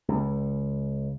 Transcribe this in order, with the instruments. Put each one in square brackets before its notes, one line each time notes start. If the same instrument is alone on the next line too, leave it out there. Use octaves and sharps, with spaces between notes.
[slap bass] C#2